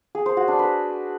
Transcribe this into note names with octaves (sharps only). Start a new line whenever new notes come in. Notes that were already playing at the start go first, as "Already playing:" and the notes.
G#4
C5
F#4
D4
B4